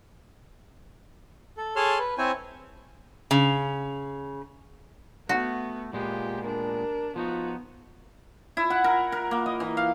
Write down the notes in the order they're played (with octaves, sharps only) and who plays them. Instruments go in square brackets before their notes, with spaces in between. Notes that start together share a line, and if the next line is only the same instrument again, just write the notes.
[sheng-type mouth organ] A4
G#4 A4 C#5 A5 C6 F6
B4
C4 E4 C5 C#5 G#5
[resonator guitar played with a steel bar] C#3
[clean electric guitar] A3 [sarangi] B3 [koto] F#4
[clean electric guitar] A#2 G#3 B3 [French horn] F4 [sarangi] G4
[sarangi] D4 [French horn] A#4
[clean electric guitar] F3 D#4 F#4 [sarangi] B3 [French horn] F4
[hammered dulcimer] E4
F#5
A#4
A#4
A#3
D#5
E3
F5